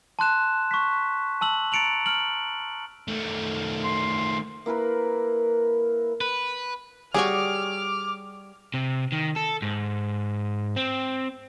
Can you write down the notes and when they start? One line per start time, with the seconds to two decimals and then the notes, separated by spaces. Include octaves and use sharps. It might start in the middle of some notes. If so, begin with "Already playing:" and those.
0.19 A5 C6 F#6 E7
0.71 C#6 B6
1.41 A5 E6 F#7
1.72 A#5 A6 C#7 D7 F7 F#7
2.06 F6 F#7
3.08 D#3 A3
3.84 C6
4.66 A#3 E4 A#4 B4
6.21 B4
7.14 G3 F#4 G#4 C#5 G#5 D6 F6
8.74 C3
9.12 D#3
9.36 A4
9.62 G#2
10.76 C4